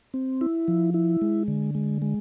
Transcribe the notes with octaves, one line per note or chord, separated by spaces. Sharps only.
C4
E4
F3
E4
G#3
D3
G#3
G#3